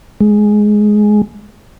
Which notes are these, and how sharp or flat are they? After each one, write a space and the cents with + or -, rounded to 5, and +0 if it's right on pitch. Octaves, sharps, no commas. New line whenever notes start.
G#3 +10